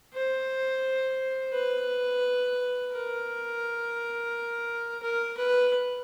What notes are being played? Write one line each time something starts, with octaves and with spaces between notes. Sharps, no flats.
C5
B4
A#4
A#4
B4